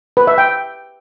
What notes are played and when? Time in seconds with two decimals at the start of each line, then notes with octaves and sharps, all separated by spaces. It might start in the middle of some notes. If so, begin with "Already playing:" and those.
0.17 B4
0.27 E5
0.38 G5